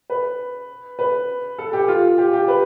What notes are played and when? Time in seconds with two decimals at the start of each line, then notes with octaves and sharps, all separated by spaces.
0.10 B4
0.99 B4
1.58 A4
1.73 G4
1.88 F4
2.18 G4
2.33 G4
2.48 B4